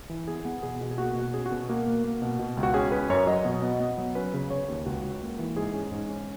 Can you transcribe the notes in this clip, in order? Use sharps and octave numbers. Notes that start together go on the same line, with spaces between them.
E3
B3 G#4
B3
B2 G#4
B2
G#4
A#3 F#4
B2
C#4 G#4
F#4
B2
A#3 F#4
A#3
A#3
B2
B2
C#2
F#4
C#4 G#4
C#4 B4
F#2 C#5
F#3 D#5
B2
B3
B3
F#3
C#4 B4
C#3
C#3 C#5
D#2
C#2 F#4
C#2
A#3
E3
G#2 G#4
C#4
G#2
C#4